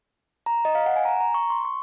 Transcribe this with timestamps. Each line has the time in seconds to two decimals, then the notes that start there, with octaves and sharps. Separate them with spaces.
0.46 A#5
0.65 D#5
0.75 F5
0.86 F#5
0.96 G#5
1.05 A#5
1.20 A#5
1.34 C#6
1.50 C6
1.65 C#6